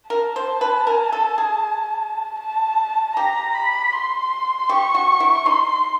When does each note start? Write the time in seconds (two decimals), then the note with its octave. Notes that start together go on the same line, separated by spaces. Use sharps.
0.10 A#4 A5
0.36 C5
0.61 B4
0.87 A#4
1.12 A4
1.38 G#4
2.40 A5
3.16 G4 A#5
3.54 B5
3.93 C6
4.69 G4 C#6
4.95 F#4
5.20 E4
5.46 D#4 C6